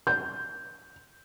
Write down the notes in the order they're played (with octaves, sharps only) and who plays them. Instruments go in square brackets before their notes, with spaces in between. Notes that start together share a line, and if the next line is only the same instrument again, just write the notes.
[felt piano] G6